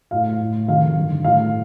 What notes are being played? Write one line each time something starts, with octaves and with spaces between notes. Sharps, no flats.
A2 F5
A2
F2 C3 D#3 F5
G2 D3
A2 F5